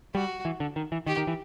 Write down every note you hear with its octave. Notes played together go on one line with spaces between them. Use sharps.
G3 F#4
E3
D3
D#3
E3
D#3 G4
D#3
E3